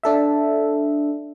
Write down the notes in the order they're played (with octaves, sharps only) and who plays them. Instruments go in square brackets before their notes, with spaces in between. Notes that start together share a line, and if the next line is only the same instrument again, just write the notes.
[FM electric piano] D4 A4 E5